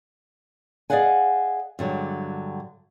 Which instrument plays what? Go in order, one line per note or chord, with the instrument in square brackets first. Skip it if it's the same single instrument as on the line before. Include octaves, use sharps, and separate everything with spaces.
[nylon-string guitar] G#4 D5 D#5 F5 F#5 G#5
G2 D3 F#3 G#3